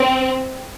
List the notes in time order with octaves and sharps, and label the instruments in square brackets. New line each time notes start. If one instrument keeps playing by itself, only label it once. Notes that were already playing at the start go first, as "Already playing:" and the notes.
Already playing: [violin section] C4